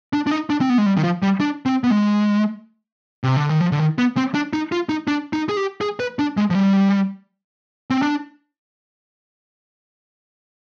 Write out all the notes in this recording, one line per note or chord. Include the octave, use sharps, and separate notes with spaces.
D4
D4
D#4
D4
C4
B3
G#3
G3
D#3
F3
G3
D4
C4
B3
G#3
C3
D3
D#3
F3
D3
D#3
B3
C4
D4
D#4
F4
D#4
D4
D#4
G#4
G4
G#4
B4
D4
G#3
F3
G3
C4
D4